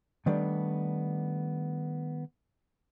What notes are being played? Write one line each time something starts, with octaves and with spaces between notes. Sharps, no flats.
D#3 G3 A3 B3 D4